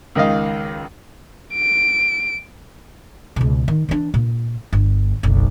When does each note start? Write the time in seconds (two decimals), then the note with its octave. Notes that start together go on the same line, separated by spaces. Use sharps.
0.15 C#2 D#3 D#5 F5
1.54 D7
3.36 C#2 B2
3.68 D#3
3.89 E3 D4
4.14 A#2
4.73 G1
5.23 F#1 B1